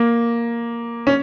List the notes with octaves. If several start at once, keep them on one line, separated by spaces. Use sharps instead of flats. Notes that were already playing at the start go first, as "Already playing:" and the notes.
Already playing: A#3
C#4